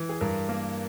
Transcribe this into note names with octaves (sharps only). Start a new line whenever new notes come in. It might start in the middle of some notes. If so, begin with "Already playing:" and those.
Already playing: E3
G#4
G2 A#4
A#3